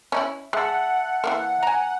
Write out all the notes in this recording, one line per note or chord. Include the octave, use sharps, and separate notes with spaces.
C#4 D#4 E4
G#3 E5 F#5 A5
E3 G#3 A#3
G#5 A#5